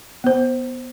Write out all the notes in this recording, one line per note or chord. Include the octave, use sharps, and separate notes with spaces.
B3 C5